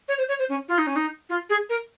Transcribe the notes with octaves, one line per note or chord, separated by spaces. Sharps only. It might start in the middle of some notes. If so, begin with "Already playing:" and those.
C#5
C5
C#5
C5
C#4
F4
D#4
C#4
D#4
F4
G#4
A#4